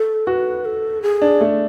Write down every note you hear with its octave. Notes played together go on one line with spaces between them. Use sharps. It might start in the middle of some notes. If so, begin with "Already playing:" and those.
Already playing: A4
F#4 B4
A4
G#4
D4
A3